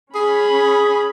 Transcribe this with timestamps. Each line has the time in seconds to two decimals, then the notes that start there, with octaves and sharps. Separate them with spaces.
0.15 C#4 G#4 B5